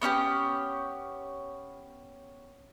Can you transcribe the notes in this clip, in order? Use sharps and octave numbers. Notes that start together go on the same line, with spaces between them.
B3 C#4 D#4 G4